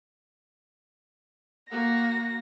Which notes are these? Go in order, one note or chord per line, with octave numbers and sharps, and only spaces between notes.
A#3 F#4 A#6